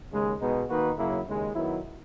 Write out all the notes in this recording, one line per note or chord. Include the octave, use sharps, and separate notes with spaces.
D#2 C#3 G#3
B2 G#3 B3 D#4
D#3 A#3 D#4 F#4 B4
F#2 C#3 F#3 A#3 E4
D#2 C#3 G#3
D#3 F#3 B3 E4